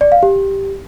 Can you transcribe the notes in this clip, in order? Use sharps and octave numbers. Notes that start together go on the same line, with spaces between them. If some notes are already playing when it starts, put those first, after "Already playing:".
D5
F5
G4